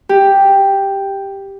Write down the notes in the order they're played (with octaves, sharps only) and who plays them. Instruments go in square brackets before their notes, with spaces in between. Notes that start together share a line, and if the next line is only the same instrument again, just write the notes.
[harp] G4